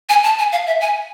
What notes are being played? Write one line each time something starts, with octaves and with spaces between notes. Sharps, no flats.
G#5
A5
G#5
F5
E5
G#5